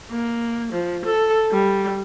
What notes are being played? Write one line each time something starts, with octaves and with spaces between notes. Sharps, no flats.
A#3
F3
A4
G3